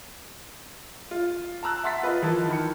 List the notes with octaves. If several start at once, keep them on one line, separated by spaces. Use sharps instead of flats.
F4
A5 A#5 E6 F#6
E5 F#5 C6 A6 B6
F4 B4 D#5
E3 F3 A#4 A5
D#3 B5 C#7